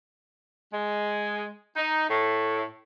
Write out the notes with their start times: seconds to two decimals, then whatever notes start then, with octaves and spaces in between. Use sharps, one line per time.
0.73 G#3
1.76 D#4
2.09 A2